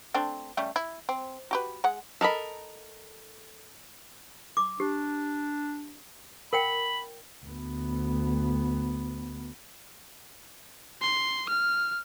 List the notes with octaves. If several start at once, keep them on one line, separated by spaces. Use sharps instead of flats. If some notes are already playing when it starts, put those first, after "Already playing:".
A3 C4 D4
C#3 G3 A3
E4
C4
F#4 G4 B4
G#3 F#5
A4 A#4 D#5 B5
D6
D4 G4
A#4 F#5 G5 B5
D2 B3
C6
F6